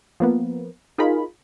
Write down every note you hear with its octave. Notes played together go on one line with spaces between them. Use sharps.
F3 A#3 B3
D#4 F4 G#4 A#4 B5